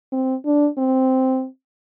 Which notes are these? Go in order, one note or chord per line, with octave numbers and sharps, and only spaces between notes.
C4
D4
C4